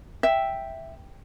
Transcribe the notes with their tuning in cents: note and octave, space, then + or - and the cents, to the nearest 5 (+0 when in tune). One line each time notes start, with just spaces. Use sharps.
E5 +0 G5 +0